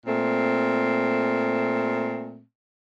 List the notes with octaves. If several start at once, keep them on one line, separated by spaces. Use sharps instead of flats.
A#2 A3 C4